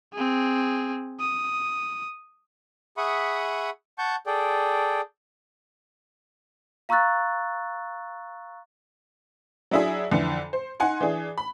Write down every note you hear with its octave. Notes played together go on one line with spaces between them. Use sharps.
C4 G#4
D#6
G#4 E5 F#5 B5 C#6 D#6
F#5 A5 C#6 G6
G#4 A4 D5 G5
F5 A#5 C#6 E6 F#6 A6
F#3 D4 E4 G#4 E5
F2 D3 E3 C#7
C5
D#4 F#5 G#5 C6
E3 D4 G#4
B5